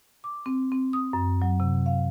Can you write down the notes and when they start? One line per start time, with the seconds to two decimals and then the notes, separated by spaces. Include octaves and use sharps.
0.24 D6
0.46 C4
0.72 C4
0.93 D#6
1.13 F#2
1.42 F#3
1.60 C3
1.86 F5